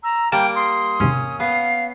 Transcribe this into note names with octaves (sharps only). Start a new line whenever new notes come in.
A#5 E6
G3 A#3 G5 A5 D7
C6 D#6
E2 G#2 C3 C#4
B3 F5 C7